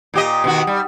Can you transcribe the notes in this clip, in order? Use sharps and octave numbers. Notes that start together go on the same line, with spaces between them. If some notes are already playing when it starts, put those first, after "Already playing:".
A#2 G4 D#5
B2 D#3 F#4
G3